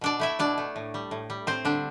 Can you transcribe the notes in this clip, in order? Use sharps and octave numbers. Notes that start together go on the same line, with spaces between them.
B2 D4 D5
A3 E4 E5
B2 D4 D5
A3
A2
G3
A2
G3
A2 C4 C5
D3 G3 D4